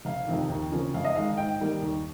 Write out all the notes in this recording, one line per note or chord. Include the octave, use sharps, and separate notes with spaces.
F1 F5
F2 C3 D#3
D#2
C#3 F3 A#3 C#4
F2 F5
D#5
D#3 G#3 D#4 F5
G#2 G5
D#3 G3 A#3 D#4
D#2